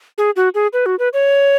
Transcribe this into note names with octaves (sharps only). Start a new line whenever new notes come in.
G#4
F#4
G#4
B4
F#4
B4
C#5